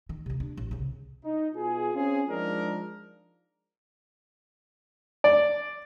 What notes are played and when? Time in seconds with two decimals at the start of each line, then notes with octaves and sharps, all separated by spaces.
0.09 D#3
0.26 D2 C3
0.40 D4
0.57 A1
0.71 C2 C#3
1.24 D#4
1.54 B2 F4 G#4
1.95 C4 C#4 F4 G#4
2.29 F3 G#3 D4 D#4 A#4
5.24 D5